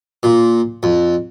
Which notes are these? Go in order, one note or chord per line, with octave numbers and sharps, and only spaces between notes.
A#2
F2